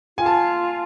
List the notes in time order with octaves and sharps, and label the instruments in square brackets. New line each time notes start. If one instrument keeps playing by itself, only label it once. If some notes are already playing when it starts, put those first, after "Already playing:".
[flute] F4 [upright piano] G#5
[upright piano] A5